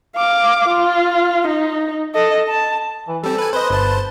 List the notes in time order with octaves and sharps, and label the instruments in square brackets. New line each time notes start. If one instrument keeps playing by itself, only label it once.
[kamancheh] F5 D6
F4
D#4
A4 D#5
A5
[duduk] E3
[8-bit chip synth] G3 C4 [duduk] A4
[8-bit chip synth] B4 G#5
[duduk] B4 [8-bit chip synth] C5 D#5
[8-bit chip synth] G1 C5 A5